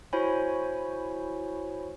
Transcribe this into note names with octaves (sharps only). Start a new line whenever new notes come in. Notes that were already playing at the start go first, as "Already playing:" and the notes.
E4 F#4 C5 C#5 G#5 B5